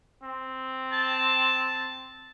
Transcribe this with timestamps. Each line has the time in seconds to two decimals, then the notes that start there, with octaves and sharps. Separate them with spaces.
0.23 C4
0.92 A5